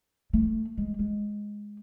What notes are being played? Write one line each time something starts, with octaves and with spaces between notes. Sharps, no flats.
A3
G#3
G#3